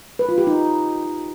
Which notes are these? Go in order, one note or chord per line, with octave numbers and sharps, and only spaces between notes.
B4
F4
G4
D#4